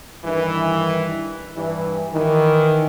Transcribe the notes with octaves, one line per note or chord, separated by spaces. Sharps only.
G2 D#3 E3
G2 E3
D#3 E3